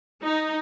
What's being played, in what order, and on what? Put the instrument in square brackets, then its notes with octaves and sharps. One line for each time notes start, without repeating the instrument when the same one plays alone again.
[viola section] D#4